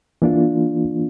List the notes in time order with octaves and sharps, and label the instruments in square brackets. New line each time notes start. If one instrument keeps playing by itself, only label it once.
[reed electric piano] E3 A#3 D4 F4